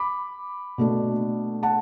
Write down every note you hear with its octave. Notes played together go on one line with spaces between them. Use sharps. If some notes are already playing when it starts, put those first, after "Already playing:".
Already playing: B5 D6
B2 A3 D4
F#5 A5